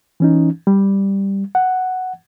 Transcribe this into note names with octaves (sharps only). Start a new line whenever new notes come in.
E3 C#4 D#4
G3
F#5